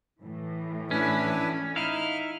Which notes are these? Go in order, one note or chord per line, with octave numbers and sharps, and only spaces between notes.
A2 E3
C#4 D4 E4 B4
D#4 E4 F5 F6